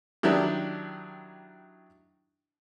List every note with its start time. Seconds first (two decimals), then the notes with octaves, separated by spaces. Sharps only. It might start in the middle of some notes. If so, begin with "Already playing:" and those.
0.23 D#3 F#3 D4 E4 G4